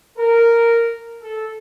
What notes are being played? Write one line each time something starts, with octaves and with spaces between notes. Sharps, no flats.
A#4
A4